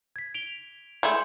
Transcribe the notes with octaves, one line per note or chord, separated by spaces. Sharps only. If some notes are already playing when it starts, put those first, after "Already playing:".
G#6 B6
D7 F7 G7
G#3 A3 E4 C6 G6